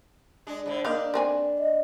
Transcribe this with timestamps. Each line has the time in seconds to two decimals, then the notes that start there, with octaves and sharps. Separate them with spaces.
0.47 G#3 D4
0.66 G#2 D3
0.85 A#3 D4 D#4 F5
1.14 A#3 C4 G#5
1.59 D#5